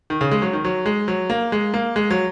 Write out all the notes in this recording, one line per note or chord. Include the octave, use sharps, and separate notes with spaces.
D#3
C#3
G#3
F#3
D#3
F#3
G#3
F#3
A#3
G#3
A#3
G#3
F#3